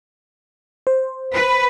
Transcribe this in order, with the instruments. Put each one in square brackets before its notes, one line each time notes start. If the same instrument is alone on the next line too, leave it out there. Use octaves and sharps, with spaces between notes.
[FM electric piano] C5
[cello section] B4